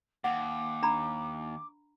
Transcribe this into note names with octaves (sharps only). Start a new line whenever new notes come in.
D#2 F#5 D6
D4 A#5 B5